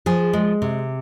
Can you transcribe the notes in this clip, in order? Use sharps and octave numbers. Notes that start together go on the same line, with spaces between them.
F3 G#4
G#3
C3